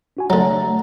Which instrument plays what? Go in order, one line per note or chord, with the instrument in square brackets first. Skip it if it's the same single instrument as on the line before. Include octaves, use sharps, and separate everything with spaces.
[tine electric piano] D4 F#4 G#5
[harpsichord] D3 F#3 [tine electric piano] A3 A#5